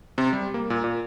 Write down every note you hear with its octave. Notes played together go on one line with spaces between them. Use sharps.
C3
G3
A#3
A#2
A#2